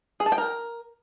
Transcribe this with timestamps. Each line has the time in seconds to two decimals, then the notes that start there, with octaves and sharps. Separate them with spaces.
0.20 G#4
0.26 A5
0.32 G5
0.38 A#4